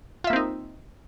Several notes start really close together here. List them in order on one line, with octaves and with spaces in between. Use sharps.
F4 E5 A#3 C4 D#4